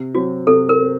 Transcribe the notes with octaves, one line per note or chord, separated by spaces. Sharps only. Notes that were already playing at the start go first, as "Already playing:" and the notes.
Already playing: C3
F#3 C4 F#4
C3 A4
A#4
C4